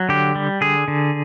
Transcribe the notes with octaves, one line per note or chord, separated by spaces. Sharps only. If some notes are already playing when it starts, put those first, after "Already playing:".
Already playing: F#3
D3 G4
G3
D3 G#4
D3